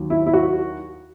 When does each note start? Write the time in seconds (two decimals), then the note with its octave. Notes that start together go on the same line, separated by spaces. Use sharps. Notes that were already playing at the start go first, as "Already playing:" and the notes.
Already playing: D#2 D#3 F#3
0.10 E4
0.26 E4
0.33 F#4